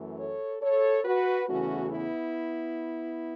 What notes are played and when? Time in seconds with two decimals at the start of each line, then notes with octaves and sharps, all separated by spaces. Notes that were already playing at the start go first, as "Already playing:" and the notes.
Already playing: F#2 E3 A3
0.18 A4 C#5
0.61 A4 C#5
1.05 F#4 B4
1.48 E2 C#3 E3 A3 C#4 F#4
1.91 B3 E4